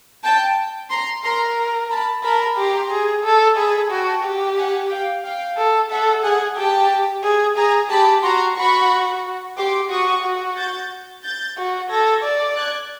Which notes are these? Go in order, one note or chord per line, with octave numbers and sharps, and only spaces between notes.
G5 A5
A#5 C6
A#4 A#5 C6
A5 B5
A#4 A5 B5
G4 A#5 C6
G#4
A4
G#4 A5 B5
F#4 G5 A5
G4
F#5 G#5
F5 G5
F5 G5
A4
A4 E5 F#5
G#4 F#5 G#5
G4 G5 A5
G#4
G#4 G#5 A#5
G4 A5 B5
F#4 A#5 C6
F#4 B5 C#6
G4 C6 D6
F#4 C#6 D#6
F#4
G6 A6
G6 A6
F#4
A4 G#6 A#6
D5
F#6 G#6